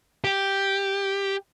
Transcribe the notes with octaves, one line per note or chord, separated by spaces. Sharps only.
G4